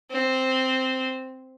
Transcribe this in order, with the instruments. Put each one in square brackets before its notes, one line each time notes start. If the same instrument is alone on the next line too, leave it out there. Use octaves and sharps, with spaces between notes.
[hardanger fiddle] C4